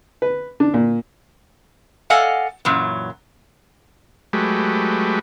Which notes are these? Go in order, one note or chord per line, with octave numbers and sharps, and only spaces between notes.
B4
D4
A#2
A4 D5 D#5 F5 F#5 G#5
F#2 A#2 E3 F#3
F#3 G#3 A3 G4 B4